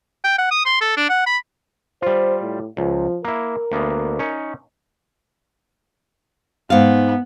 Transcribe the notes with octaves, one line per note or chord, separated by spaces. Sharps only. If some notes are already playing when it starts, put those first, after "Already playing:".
G5
F#5
D#6
C6
A4
D4
F#5
B5
G3 F4 C5
A2
C#2 F3
A#3 E4 A#4
D2 A#3 B3
C#4 D#4 C#5
G#2 B3 F5